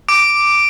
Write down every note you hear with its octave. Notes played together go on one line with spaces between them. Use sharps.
D6 D7